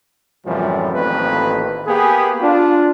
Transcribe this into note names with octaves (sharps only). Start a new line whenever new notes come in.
F#2 A2 C3 E3 F3 G3
A1 F2 D#3 A#3 C4 B4
A#3 B3 G4 G#4
D4 F4